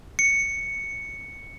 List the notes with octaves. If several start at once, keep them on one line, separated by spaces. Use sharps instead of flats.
C#7